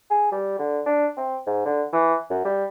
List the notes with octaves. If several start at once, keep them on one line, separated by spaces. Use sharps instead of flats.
G#4
G3
D3
D4
C4
G#2
D3
E3
F#2
G3